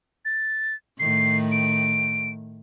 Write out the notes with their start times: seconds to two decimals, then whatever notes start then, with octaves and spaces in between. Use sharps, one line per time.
0.25 A6
1.00 A2 D#3 C7
1.52 D7